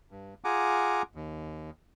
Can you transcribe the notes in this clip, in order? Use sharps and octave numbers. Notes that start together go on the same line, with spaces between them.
G2
F4 G#4 F#5 G#5 A#5 D6
D#2